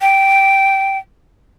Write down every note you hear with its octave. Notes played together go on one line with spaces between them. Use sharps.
G5